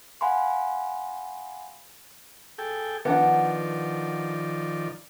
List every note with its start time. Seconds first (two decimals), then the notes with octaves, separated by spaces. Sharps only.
0.21 F5 F#5 G#5 B5 C6
2.58 G#4 A4 G5
3.05 D#3 F3 B3 D4 D5 F#5